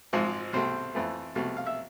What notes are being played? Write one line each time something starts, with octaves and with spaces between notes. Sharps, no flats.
G#1 G#2 F3 G#3
C2 B2 A3 C4 C5
F2 E3 A3
C2 B2 A3
F5
E5